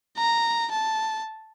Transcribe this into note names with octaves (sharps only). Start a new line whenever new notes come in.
A#5
A5